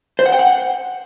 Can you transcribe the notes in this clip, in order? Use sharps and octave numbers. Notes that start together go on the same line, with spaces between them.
C5
F#5
G5
F#5